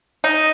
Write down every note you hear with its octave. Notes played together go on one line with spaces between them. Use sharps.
D#4